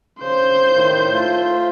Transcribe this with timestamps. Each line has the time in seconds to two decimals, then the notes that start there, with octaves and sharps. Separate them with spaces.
0.20 C#3 C5 G6
0.74 A2 D#3
1.13 A3 F4